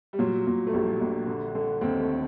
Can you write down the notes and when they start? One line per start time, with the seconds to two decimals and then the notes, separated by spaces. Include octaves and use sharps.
0.13 G3
0.19 A#2 F#3
0.47 A#2
0.67 A3
0.73 A#1 G3
1.01 A#1
1.27 D3
1.55 D3
1.81 D#2 C4
2.00 A3